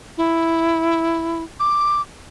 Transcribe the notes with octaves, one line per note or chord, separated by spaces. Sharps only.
E4
D6